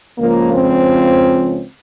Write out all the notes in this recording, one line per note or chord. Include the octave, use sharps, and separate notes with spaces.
C#2 C#3 F3 A#3
C4